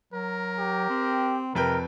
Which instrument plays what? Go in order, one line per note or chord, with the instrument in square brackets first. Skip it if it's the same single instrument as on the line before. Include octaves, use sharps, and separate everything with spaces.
[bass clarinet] F#3 [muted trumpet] A#4
[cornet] G4
[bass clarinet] C4
[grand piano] F2 B4 G5 [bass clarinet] C3 [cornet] A#4